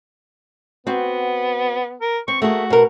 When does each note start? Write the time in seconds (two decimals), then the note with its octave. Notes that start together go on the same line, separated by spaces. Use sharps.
0.87 B3 C4 F#4
2.01 A#4
2.28 C4 C#6
2.42 A3 A#3 F#4 G#4
2.70 B2 A#4